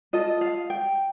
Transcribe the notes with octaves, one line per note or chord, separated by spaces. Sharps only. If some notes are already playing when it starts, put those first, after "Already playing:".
F4 A4 D#5
F5
G5